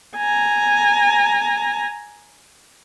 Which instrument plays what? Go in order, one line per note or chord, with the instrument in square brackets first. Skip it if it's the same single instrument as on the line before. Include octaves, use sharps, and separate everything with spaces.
[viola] G#5 A#5